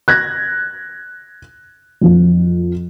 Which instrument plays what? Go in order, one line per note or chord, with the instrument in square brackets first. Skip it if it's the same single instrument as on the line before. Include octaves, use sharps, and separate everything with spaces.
[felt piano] F#6 G#6 A#6
F2 F3